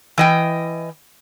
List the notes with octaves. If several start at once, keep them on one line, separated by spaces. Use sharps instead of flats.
E3 D#5 G5